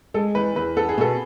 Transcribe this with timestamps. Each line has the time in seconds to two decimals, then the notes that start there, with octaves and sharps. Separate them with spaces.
0.14 G#3 A4
0.35 E2 B4
0.56 E2 B4
0.76 B3 A4
0.89 G#4
0.98 B2 A4